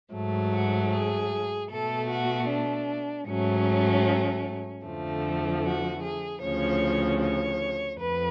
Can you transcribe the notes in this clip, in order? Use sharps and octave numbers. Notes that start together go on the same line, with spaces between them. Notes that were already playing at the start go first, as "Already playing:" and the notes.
G#2 F#3 A3
F#4
G#4
B2 A3 A4
F#4
D4
G#2 F#3 A3 C#4
F2 D3 F3 A3
F#4
G#4
D2 C#3 F3 C#5
C#5
F2 B4